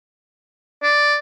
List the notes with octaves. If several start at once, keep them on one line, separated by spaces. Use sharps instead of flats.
D5